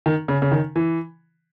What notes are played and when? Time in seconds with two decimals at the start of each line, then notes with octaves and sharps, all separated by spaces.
0.06 D#3
0.28 C#3
0.42 C#3
0.52 D#3
0.76 E3